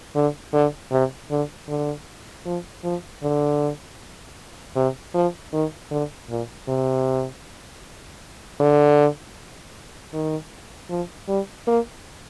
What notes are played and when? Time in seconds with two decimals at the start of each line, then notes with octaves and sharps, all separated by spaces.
0.15 D3
0.54 D3
0.91 C3
1.31 D3
1.68 D3
2.46 F3
2.84 F3
3.23 D3
4.76 C3
5.14 F3
5.53 D#3
5.91 D3
6.30 A#2
6.68 C3
8.60 D3
10.13 D#3
10.90 F3
11.28 G3
11.67 A#3